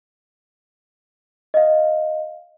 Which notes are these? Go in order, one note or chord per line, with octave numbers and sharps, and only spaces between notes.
D#5 F5